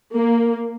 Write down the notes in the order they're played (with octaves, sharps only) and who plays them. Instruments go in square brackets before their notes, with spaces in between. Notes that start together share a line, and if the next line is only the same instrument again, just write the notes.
[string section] A#3